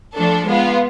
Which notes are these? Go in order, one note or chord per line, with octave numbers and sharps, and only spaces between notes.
F3 A3 D4 A4
G#3 B3 F4